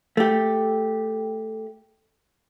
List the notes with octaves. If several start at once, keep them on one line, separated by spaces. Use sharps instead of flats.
A3 G4